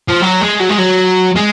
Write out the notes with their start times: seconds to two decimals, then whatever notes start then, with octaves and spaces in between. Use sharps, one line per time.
0.08 F3
0.21 F#3
0.41 G#3
0.60 F#3
0.70 G#3
0.79 F#3
1.36 G#3